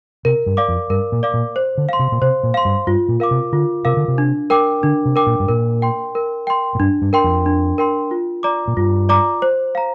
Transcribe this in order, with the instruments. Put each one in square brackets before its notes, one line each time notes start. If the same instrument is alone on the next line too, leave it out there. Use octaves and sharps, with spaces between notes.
[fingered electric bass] C3 [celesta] A#4
[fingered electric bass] G2
[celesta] D5 F5 D6
[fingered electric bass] F2
[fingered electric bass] G2 [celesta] A#4
[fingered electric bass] A#2
[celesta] D5 F5 D6
[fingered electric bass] A#2
[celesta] C5
[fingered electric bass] D3
[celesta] F5 C6
[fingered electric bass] C3
A#2
[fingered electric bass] C3 [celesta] C5
[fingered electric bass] A#2
[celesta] F5 C6
[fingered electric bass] G2
[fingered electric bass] G2 [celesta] F4
[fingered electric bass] A#2
[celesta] A#4 F5 D6
[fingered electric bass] C3
[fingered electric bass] D3 [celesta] F4
[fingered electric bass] C3 [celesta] A#4 F5 D6
[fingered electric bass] D3
C3
[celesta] D4
A#4 G5 D6
[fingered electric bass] D3 [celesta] D4
[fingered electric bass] C3
[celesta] A#4 G5 D6
[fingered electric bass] A#2
G2
[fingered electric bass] A#2 [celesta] A#4
[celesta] G5 C6
A#4
G5 C6
[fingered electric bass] A#2
[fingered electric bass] G2 [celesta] D4
[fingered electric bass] G2
[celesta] A#4 G5 C6
[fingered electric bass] F2
[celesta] D4
A#4 G5 C6
F4
D5 A#5 D6
[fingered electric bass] A#2
[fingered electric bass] G2 [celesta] F4
[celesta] D5 A#5 D6
C5
F5 A#5